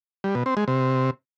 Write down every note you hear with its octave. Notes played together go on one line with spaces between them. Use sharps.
G3
B2
C4
G#3
C3